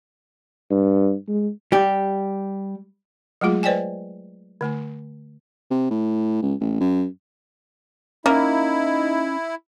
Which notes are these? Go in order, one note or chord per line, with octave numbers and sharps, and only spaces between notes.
G2
G#3
G3 G4
F#3 G#3 A3 F4 G#4
B4 C5 D5 D#5 G5 G#5
D3 A3 G#5
C3
A2
C#2
A1
F#2
A#3 C#4 D#4 E4